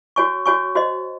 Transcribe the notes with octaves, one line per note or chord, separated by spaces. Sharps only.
F#4 C#5 G#5 C#6
F#4 C#5 G#5 C#6
F#4 C5 D#5